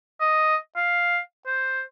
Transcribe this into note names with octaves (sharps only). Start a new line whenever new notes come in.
D#5
F5
C5